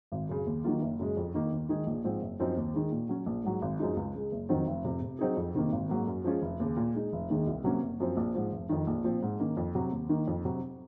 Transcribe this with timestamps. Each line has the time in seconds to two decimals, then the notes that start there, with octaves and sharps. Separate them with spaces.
0.12 G#1
0.29 F#2 C#3
0.46 D#2
0.64 D#3 F#3 A#3 F4
0.81 F#1
0.99 F#2 C#3 G#3
1.17 F2
1.34 D#3 A#3 D#4
1.52 D#2
1.69 D#3 G#3 D#4 G#4
1.87 A#1
2.04 G#2 F3 C4
2.22 F#1
2.40 F#2 F3 C4 D#4
2.57 D#2
2.74 D#3 G#3
2.92 A#2
3.09 F#3 C#4
3.26 A#1
3.44 G#2 F#3
3.62 G#1
3.79 F#2 F3 G#3 D#4
3.97 C#2
4.15 C#3 G#3
4.32 F#1
4.49 F2 D#3 F#3 C4
4.67 F1
4.84 F2 C3
5.02 C3
5.19 F#3 C4 D#4 G#4
5.37 F2
5.55 C3 D#3 A#3
5.72 G#1
5.89 G#2 F#3 A#3
6.07 F#2
6.24 F3 G#3 C#4 F4
6.42 F1
6.60 D#2 C#3
6.77 A#2
6.95 G#3 D#4
7.12 F1
7.30 D#2 D#3 G#3
7.47 C2
7.64 C3 F#3 A#3 C#4
7.82 F#1
8.00 F#2 F3 C4
8.17 A#1
8.35 G#2 F3
8.52 F1
8.69 F2 D#3
8.87 A#1
9.04 A#2 F3 C4
9.22 G#2
9.39 D#3 A#3 C#4
9.57 F2
9.75 C3 F#3
9.92 D#2
10.09 D#3 A#3
10.27 F2
10.45 C3 F#3